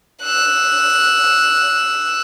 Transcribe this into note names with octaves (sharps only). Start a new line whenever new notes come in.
E6 F#6